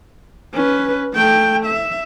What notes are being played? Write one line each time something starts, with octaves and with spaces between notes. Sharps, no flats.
C#4 B4
A3 G5
E5